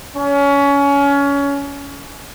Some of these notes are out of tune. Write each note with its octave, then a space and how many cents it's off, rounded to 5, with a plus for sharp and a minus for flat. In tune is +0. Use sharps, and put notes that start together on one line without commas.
C#4 +25